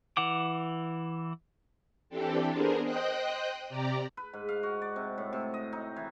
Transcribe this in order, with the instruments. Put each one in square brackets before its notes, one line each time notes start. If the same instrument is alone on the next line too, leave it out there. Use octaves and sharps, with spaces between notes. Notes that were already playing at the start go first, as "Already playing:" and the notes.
[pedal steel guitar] E3 F#5 D6
[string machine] E3 C4 D4 G4 A4
B3 D4 G#4 A#4 C5
C5 D#5 G5 D#6 F#6
C3 G4 D5 A#5
[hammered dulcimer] B4
G#2
F5
F#4
D5
C3
A2
C3
D#5
D#4
E3